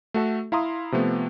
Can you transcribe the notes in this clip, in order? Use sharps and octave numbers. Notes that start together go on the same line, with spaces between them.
A3 F#4 A4 E5
E4 F5 A#5 C6 D#6
C3 F3 A3 B3